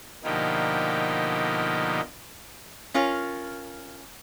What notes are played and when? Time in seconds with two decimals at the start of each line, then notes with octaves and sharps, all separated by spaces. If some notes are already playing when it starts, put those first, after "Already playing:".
0.24 B2 D3 F3 A#3 D#4 G4
2.94 C#4 F4 A#4